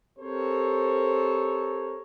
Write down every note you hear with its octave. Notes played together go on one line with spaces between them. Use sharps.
C4 G4 A4 A#4 C5 C#5